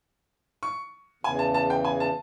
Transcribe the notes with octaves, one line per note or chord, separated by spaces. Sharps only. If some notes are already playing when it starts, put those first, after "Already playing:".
C#6
E2 C#3 E3 G#5
A5
A5
G5
G#5
A5